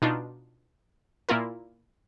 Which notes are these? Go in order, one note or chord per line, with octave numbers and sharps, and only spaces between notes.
B2 D4 D#4 F4
A#2 A#3 E4 F4 A#4